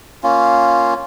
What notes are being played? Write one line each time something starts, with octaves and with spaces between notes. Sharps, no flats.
A#3 C#4 F4